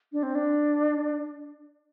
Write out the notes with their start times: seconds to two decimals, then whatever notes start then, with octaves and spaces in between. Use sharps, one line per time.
0.12 D4
0.23 C4
0.35 D4